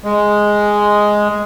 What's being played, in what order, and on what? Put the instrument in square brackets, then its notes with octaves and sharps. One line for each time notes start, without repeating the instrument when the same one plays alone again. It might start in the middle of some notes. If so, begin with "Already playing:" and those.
[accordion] G#3